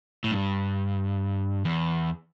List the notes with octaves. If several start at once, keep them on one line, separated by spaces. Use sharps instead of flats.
A2
G2
E2